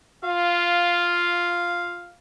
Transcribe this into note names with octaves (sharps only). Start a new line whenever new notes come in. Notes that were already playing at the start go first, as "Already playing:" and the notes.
F4 F5